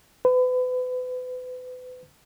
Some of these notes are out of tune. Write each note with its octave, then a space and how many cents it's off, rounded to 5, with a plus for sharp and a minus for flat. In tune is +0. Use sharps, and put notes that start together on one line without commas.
B4 +35